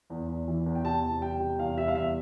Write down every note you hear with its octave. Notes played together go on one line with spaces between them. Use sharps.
E2
E2
E3
E2
G5
C3 A5
E2
G3 G5
C3
E2 F5
G3 E5
F5
E2 E5